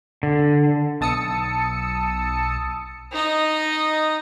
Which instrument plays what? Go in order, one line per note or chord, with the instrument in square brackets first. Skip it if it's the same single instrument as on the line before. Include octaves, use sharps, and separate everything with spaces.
[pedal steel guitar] D3
[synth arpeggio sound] B1 A5 D#6 E6 C#7
[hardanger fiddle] D#4 D#5